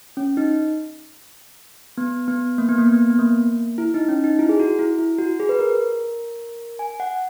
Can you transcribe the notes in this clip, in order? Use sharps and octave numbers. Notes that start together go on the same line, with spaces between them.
C#4
D#4
B3
B3
A#3
B3
A#3
B3
B3
A#3
E4
D#4
C#4
D#4
E4
G#4
F#4
E4
E4
F#4
G#4
B4
A#4
G#5
F#5